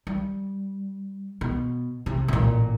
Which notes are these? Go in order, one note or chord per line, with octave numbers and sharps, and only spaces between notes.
G3
B2
C3
A1 A#2